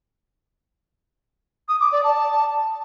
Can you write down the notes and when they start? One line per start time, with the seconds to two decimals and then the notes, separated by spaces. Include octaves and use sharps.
1.69 D#6
1.80 D6
1.92 D5
2.04 A5